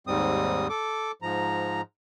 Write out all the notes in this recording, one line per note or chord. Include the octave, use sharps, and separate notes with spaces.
D#2 G#2 G3 C4 D#6
A4 D6
G#2 F3 A#5